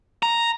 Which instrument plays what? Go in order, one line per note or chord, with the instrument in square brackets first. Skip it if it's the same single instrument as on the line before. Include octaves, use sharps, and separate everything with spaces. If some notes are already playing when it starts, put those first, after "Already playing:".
[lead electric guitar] A#5